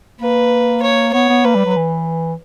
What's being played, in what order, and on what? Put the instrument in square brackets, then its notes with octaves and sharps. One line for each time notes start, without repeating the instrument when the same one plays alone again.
[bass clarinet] A#3 [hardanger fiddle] B4
[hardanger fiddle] C#5
[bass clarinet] B3 [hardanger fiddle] C#5
[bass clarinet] B3
[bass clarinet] A#3 [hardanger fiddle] B4
[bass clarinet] G3
F#3
E3